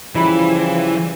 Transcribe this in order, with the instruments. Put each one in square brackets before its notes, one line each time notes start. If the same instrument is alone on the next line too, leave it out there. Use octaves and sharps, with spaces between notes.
[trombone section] C#3 F3 G3 [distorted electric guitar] E3 [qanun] E4 B5